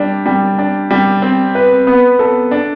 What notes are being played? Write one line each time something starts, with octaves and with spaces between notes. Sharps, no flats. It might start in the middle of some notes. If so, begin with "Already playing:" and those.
Already playing: G3 D4
G3
D4
G3
C4
B4
B3
A4
D4